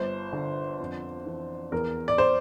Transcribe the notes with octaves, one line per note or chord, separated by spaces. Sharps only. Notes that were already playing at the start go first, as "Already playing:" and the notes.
Already playing: G1 C5
D3
F2
E3
E2 A#4
D5
C5